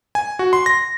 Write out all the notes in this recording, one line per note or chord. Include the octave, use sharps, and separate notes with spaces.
G#5
F#4
C6
A#6